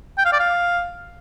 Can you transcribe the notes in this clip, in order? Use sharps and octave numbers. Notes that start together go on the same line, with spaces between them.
G5
F5
D5
F5